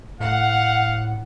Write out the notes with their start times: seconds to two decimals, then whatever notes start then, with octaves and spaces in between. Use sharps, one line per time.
0.20 A2 F5 F#5